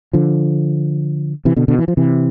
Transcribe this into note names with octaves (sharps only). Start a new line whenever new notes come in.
D3 F3
C3 E3
B2 D3
B2 D3
E3
F3
C3 E3